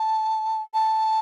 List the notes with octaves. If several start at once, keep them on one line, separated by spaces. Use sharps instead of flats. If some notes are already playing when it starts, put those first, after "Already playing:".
Already playing: A5
A5